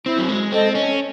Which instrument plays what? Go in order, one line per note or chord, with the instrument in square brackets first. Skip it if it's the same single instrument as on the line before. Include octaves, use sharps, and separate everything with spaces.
[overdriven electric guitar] C4 [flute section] E4
[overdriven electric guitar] F#3
G#3
[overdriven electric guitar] C4 [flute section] A4 D#5
[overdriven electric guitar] C#4